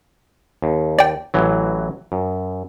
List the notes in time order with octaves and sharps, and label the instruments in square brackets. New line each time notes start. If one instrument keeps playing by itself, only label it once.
[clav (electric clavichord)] D#2
[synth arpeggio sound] D5 G5
[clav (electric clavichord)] A1 E3 F#3
F#2